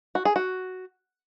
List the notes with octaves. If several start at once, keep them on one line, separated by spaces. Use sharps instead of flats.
F#4
G#4
F#4